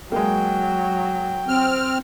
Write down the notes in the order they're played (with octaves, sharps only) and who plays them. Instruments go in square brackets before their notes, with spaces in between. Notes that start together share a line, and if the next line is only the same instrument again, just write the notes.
[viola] F#3 [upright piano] G#3 A#3 [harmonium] G5
[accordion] C4 F6